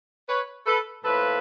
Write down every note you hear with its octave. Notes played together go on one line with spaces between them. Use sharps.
B4 C#5
A4 B4
A2 F3 A#3 A4 B4